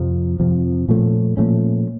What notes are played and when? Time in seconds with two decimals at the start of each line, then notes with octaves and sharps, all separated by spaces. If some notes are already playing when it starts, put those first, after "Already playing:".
Already playing: F2 C3 F3
0.40 F2 C3 F3
0.88 A#2 F3 A3 C#4
1.37 A#2 F3 A3 C#4